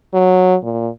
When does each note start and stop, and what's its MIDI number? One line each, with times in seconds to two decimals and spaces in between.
0.14 0.56 54
0.63 0.89 46